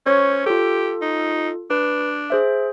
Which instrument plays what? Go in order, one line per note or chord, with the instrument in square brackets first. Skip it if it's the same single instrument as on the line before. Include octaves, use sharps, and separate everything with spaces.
[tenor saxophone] C#4 [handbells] C5 C#5 C#6
[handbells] F4 A4 [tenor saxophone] G4
[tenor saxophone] D#4
[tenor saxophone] D4 [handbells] B4
[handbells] G#4 C5 E5